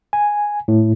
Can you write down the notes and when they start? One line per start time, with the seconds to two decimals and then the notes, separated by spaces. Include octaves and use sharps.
0.13 G#5
0.68 A2